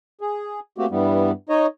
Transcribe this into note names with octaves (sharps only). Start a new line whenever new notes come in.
G#4
A3 A#3 C4 F#4 G4
G2 E3 G3 B3
D#4 C#5 D#5